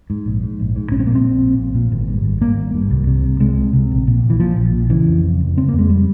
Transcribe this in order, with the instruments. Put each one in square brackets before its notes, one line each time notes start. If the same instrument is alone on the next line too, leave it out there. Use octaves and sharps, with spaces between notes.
[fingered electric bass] G#2
A#1
G#2
A#1
G#2
A#1 C#4
C4
A#2 A#3
C4
A#1
A#2
A#1
A#2
G#1
G2
G#1
G2 A#3
G#1
G2
C2
C3
C2
C3 G#3
C2
C3
A#1
A#2
A#1
E3
A#2 F3
A#1
A#2
C#3 E3
F2
F1
F1
C#3 C4
F2 A#3
G#3
G3